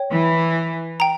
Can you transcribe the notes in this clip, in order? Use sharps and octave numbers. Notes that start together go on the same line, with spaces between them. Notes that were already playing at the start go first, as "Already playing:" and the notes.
Already playing: C#5 G5
E3
G5 A#5